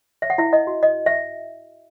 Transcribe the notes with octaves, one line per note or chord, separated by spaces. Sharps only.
C#5 E5
F#5
E4 E5
D#5
F#4
D#5
E5